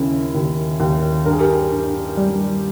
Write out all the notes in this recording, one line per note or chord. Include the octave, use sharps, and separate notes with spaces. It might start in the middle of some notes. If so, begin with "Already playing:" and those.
Already playing: D#2 C#3 E4
D#2
D#2
G2 A#4
G#4
G4 A#4
G2
G3